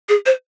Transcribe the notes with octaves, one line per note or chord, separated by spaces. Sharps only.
G#4
C5